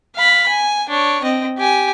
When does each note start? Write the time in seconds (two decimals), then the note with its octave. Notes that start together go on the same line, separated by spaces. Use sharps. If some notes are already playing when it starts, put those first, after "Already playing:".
0.15 F5 B5
0.49 G#5
0.89 D4 C#5
1.22 C4 D#5
1.58 G4 G#5